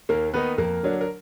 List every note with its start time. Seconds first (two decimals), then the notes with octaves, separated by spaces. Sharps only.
0.09 D#2 A#3 A#4
0.34 D#3 A#3 B3 D#4 B4
0.58 F2 A#3 A#4
0.83 D3 F#3 D4
1.01 A#4